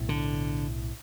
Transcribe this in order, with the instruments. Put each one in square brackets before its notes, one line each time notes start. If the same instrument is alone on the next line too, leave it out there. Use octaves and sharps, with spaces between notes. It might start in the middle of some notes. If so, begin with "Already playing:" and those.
Already playing: [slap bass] B1 A2
D3